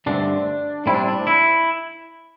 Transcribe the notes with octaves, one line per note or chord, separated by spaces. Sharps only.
G2 D3 A3 C4 D4
A2 G3 C4 E4
D4
D4
E4